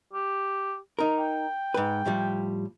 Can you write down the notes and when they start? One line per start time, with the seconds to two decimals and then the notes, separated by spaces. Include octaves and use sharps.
0.13 G4
0.99 D#4 A#4
1.18 G5
1.74 G#2 B4
2.06 A2 F3 G3